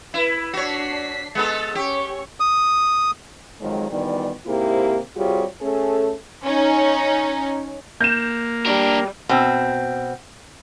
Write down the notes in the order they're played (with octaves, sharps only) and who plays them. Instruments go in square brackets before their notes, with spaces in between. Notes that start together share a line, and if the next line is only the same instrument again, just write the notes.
[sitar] E4 [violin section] B4
[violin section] D4 B6 C7 [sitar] F#4 C#5
[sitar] G#3 B3 A4 [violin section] A6
[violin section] C#4 C#5 C#6 [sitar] G4
[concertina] D#6
[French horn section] F2 D#3 F#3 G#3
D2 D#3 E3 G3 B3 D5
G#2 C3 A#3 E4 G4
C3 G3 F4 F#4 G#4 C#5
A3 C#4 G#4 A4
[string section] C#4 D#4
[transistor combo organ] A#3 [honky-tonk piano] G6 E7
[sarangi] G3 [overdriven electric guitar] D4 A#4
[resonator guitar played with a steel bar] B2 C4